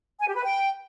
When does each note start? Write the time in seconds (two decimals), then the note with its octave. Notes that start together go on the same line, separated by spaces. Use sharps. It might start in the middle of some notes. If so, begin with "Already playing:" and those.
0.19 G#5
0.27 G4
0.36 B4
0.44 G5